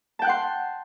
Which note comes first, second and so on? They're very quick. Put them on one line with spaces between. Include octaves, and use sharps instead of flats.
A5 G5 F#6 F#5 C6